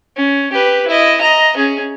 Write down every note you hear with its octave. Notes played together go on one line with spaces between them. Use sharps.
C#4
G4 B4
E4 D#5
D#5 A#5
C#4 G#4